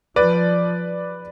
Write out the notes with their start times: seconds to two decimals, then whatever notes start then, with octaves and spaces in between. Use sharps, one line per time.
0.16 F3 B4 D5